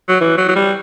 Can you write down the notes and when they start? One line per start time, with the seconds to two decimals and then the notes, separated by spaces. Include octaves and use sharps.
0.09 F#3
0.20 E3
0.37 F#3
0.49 F#3
0.56 G3